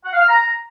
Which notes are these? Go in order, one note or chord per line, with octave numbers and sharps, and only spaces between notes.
F#5
F5
F6
A#5